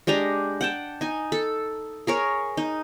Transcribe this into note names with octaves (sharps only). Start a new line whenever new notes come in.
G#3 D4 G4 A#5
F#5 G5 A5
D#4 G#5
A4
G#4 A#4 C#5
D#4